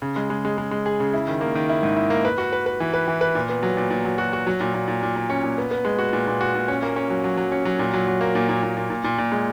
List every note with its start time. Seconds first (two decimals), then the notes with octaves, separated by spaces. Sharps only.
0.02 C#3
0.16 G#3
0.30 G#3
0.45 G#3
0.58 G#3
0.71 G#3
0.86 G#4
1.00 C#3
1.14 E4
1.28 D#3
1.41 A#3
1.55 D#3
1.69 E4
1.83 G#2
1.97 E4
2.10 A#3
2.25 B4
2.38 F#4
2.53 B4
2.66 B4
2.80 E3
2.93 B4
3.08 E3
3.21 B4
3.35 A#2
3.49 B3
3.63 F#3
3.77 A#2
3.90 A#2
4.05 F#3
4.18 F#4
4.33 F#4
4.47 F#3
4.60 A#2
4.74 A#2
4.88 A#2
5.03 A#2
5.16 A#2
5.30 C#4
5.43 A#2
5.58 B3
5.71 B3
5.85 G#3
5.99 F#4
6.13 A#2
6.27 A#2
6.41 F#4
6.55 A#2
6.68 C#4
6.83 A#3
6.96 C#4
7.10 F#3
7.24 F#3
7.37 F#3
7.52 C#4
7.65 F#3
7.79 A#2
7.93 F#3
8.07 F#3
8.21 A#3
8.35 A#2
8.49 A#2
8.63 A#2
8.77 A#2
8.90 A#2
9.04 A#2
9.18 A#2
9.32 G#3